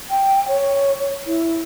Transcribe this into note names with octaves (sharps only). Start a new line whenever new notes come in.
G5
C#5
E4